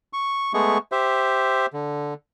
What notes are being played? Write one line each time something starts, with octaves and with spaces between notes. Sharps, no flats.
C#6
G#3 A3 B3 G#4 C#6
G4 C5 E5
D3